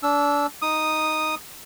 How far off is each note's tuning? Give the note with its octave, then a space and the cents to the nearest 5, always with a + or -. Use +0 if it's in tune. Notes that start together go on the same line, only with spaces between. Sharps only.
D4 -30 E6 +0
D#4 +0 D#6 -5